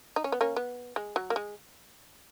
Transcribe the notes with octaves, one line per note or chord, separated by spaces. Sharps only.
D#4
C#4
B3
A#3 C#4
B3
G#3
F#3
A#3
G#3